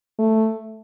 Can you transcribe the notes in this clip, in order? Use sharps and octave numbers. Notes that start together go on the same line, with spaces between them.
A3